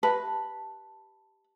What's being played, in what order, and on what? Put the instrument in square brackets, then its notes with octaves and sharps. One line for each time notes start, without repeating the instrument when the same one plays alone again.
[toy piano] G4 E5 A5 [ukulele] B4